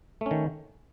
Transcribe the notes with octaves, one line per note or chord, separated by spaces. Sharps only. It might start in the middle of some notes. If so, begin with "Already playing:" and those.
D#3 A3 C#4